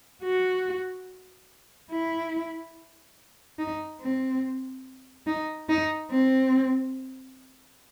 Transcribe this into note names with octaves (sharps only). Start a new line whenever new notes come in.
F#4
E4
D#4
C4
D#4
D#4
C4